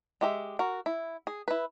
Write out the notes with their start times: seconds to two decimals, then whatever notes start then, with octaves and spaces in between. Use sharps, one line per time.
0.21 G#3 G4 E5
0.59 F#4 A#4
0.86 E4
1.27 G#4
1.48 E4 B4